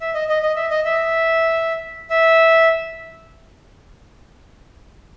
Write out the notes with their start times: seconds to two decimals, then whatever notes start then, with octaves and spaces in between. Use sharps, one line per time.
0.01 E5
0.14 D#5
0.29 D#5
0.43 D#5
0.56 E5
0.71 D#5
0.85 E5
2.10 E5